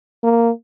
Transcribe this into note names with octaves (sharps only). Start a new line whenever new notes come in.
A#3